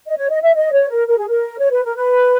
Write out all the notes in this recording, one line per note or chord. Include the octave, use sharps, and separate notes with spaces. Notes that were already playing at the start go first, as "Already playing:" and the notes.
D#5
C#5
D#5
E5
D#5
C#5
A#4
A#4
G#4
A#4
C#5
B4
A#4
B4